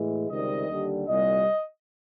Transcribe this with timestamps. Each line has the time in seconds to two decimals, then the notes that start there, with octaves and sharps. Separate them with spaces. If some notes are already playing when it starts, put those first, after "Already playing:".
Already playing: A2 E3 G#3
0.29 C#2 C3 D#3 G3 D#5
0.69 D#2 D3 G3
1.08 C2 A#2 G3 D#5